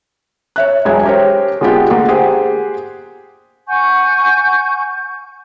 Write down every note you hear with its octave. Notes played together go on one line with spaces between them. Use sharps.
C#5 E5 F#6
E1 F#3 G#3 E5 G#6
G4 A#4 C5 C#5
D3 G#3 B3 F4 G4 G#4
D3 A3 A#3
G4 G#4 C5 F#5
F#5 G#5 C#6 G6